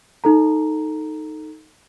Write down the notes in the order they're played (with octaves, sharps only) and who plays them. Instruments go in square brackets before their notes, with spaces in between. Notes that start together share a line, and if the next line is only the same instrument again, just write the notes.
[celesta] D#4 A4 A#5